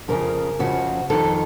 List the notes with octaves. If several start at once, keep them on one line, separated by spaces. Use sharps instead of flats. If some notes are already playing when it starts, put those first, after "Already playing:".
F2 C#3 F3 A#4
F2 C#3 F3 F#4
F2 D#3 A4